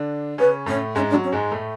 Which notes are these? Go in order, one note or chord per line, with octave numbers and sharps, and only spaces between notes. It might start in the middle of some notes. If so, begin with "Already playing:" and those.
Already playing: D3 D4
C#3 C#4 B4
A2 A3 C#4
G#2 G#3 C#4
D4
F#3
C#4
G#2 G#3
A2 A3